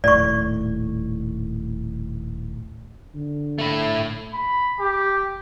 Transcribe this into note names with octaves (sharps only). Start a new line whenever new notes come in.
D#1 A2 D5 C#6
D3
A3 E4
B5
G4